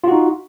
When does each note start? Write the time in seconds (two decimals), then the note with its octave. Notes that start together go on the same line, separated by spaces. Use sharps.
0.04 F4
0.08 F#4
0.12 D#4